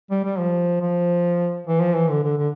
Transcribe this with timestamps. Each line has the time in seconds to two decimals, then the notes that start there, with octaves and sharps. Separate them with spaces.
0.11 G3
0.25 G3
0.39 F3
0.81 F3
1.67 E3
1.81 F3
1.96 E3
2.10 D3
2.24 D3
2.38 D3